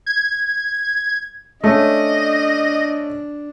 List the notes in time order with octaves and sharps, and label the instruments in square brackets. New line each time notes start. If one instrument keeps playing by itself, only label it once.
[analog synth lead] G#6
[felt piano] A3 C#4 [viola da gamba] D4 [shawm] D#5